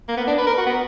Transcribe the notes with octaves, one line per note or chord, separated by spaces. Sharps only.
A#3
B3
D4
B4
A#4
F#4
B3